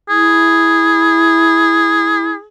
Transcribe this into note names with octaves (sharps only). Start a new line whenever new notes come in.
E4 G#4